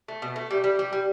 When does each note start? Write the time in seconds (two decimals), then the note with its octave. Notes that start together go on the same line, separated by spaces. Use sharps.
0.08 A3
0.22 B2
0.36 A3
0.51 G3
0.64 G3
0.79 G3
0.93 G3